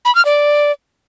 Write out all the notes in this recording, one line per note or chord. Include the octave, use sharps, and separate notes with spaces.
B5
F6
D5